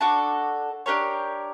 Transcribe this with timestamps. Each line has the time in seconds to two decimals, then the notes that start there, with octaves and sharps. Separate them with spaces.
0.01 D4 F#4 A4
0.86 D4 G4 A#4 C#5